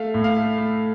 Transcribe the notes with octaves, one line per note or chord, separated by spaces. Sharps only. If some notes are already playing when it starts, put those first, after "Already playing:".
Already playing: A3 F5
A2
F5
A3
A3